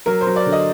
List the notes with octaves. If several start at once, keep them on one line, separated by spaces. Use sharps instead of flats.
F#3 A#4
C5
F#3
D5
D3
D#5